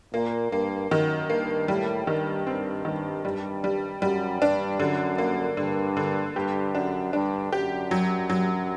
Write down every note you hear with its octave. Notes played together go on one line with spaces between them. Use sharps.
A#2 A#3
G2 A#3
F#2 D#3
G2 A#3
A2 G3
G2 D#3
G2 C4
G2 D#3
G2 G3
G3
F#2 G3
G2 D4
F#2 D3
A#3
G2 D3
D3
G2 G4
F#2 D4
G2 D4
F#2 G4
F#3
F#3